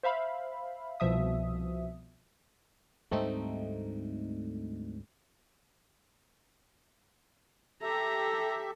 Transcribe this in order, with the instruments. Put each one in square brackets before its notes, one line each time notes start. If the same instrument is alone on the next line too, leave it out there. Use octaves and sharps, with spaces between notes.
[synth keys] C5 E5 F5 B5
C2 B2 F3 E5 D#6
[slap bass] D2 G#2 G3 [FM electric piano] A3 C4 D#4
[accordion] G4 E5 [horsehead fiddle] A4 [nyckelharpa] A#5